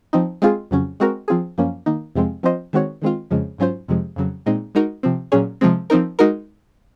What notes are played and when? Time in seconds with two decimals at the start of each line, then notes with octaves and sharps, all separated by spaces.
0.13 F3 C4 D#4
0.42 G#3 C4 F4 G#4
0.71 F2 C#3 F#3 C#4
1.00 G#3 C4 F#4 A#4
1.28 F3 C4 F4 G#4
1.58 F#2 F3 A#3 C#4
1.86 D#3 A#3 D#4
2.15 F2 C3 F3 G#3 C4
2.43 F3 C4 F4 C5 D#5
2.73 D#3 G#3 C4 F#4 C#5
3.02 D#3 G#3 C4 F4
3.31 F2 C#3 F3 G#3
3.58 G#2 F#3 C#4 F4 C5
3.88 F2 C3 F3 G#3
4.16 F2 C#3 F#3
4.46 A#2 G#3 C4 D#4
4.75 G#3 D#4 F#4 A#4
5.03 C3 F3 C4
5.32 A#2 F#3 C#4 G#4 C#5
5.61 C3 F3 G#3 C4
5.90 F3 C4 D#4 A#4
6.19 G#3 D#4 F#4 A#4